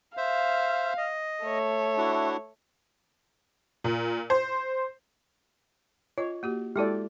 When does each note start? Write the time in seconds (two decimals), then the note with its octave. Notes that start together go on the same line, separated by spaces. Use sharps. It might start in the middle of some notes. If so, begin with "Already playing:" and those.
0.17 C5 E5 F5
0.98 D#5
1.44 A3 C#5
1.98 D4 E4 F#4
3.84 A#2
4.30 C5
6.18 F4 C#5 D#5
6.43 A#3 F#4 G4
6.76 G#3 E4 F#4 G4 A4 D5